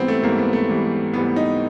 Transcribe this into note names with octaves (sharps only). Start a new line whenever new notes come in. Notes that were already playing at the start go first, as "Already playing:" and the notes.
Already playing: G#2 E3 G3 B3 C4
A3
G#2 E3 G3 A#3
B3
A3
G#2 E3 G3
G#2 E3 G3 B3
D#4